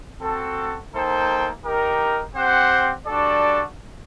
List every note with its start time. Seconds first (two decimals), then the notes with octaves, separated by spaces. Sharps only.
0.21 C4 F#4 A4
0.93 A#3 D#4 A4 C5 G5
1.64 D#4 G4 A#4
2.36 C4 G4 C5 F#5
3.07 G3 D4 F#4 A4 D5